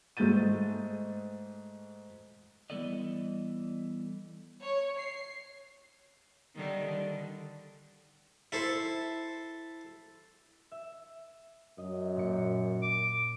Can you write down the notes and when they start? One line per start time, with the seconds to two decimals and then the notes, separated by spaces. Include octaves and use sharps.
0.17 G#2 A3 G#4 G6 A6 D#7
2.70 E3 G3 B3 A4 D5 D#5
4.62 C#5
4.99 C7
6.56 D3 D#3 G3
6.86 D3
8.52 E4 A4 C5
10.71 E5
11.78 F#2 D#5
12.16 A#2 C#7
12.82 D6